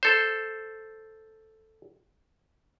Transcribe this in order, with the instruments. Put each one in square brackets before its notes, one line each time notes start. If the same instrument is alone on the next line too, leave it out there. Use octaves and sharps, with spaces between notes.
[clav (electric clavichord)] A4 C5